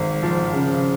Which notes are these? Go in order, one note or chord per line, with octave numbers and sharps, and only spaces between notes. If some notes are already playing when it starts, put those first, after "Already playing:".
Already playing: G#1
F3
C#3